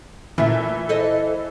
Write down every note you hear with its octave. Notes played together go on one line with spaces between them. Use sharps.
A#2 E3 A3 E5
A4 C5 D#5